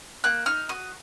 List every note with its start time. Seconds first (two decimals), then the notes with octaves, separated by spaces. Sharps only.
0.24 A#3 F#6
0.46 D#4 F6
0.69 F#4 D#6